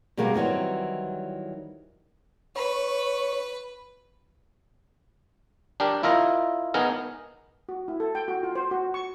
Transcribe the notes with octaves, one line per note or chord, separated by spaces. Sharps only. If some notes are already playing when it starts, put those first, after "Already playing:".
B2 D#3 G3 G#3 A#3 B3
D#3 E3 F#3 G3 C4
B4 C#5
D4 G4 A#4
E4 F4 A#4 D#5
B3 D#4 G#4 A#4
F#4
E4
A4
G5
F#4
F4
C5
F#4
C#6